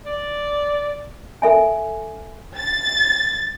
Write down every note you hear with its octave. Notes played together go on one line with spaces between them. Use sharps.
D5
A4 E5 G#5
A6